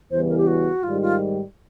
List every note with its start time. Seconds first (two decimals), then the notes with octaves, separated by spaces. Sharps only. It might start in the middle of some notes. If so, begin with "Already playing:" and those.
0.11 E2 C#3 E3 G3 B3 C5
0.29 A#4
0.38 G4
0.47 F#4
0.83 G#2 D#3 G3 F4
1.02 F4